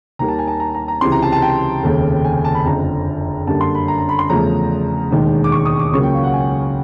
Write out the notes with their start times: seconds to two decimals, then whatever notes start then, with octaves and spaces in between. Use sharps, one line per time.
0.19 D#2 D#3 G3 A#3 A#5
0.28 A5
0.39 G#5
0.47 A5
0.60 A#5
0.74 A#5
0.88 A#5
1.01 C#2 C3 E3 C6
1.12 A#5
1.22 A5
1.32 A5
1.42 G5
1.83 F1 D#2 C#3
2.24 G#5
2.45 A5
2.54 B5
2.66 F#1 F2 D3 A#5
3.47 F#2 D3 G3 A#3 A5
3.61 C6
3.75 B5
3.88 A#5
3.98 A#5
4.09 B5
4.19 C6
4.29 E2 C#3 F3 A3 A#5
5.11 E1 D#2 D#3 G#3
5.44 D6
5.52 C#6
5.66 D#6
5.79 D6
5.93 C#2 C#3 F#3 A#3 C#6
6.03 G5
6.13 F5
6.24 F#5
6.34 G#5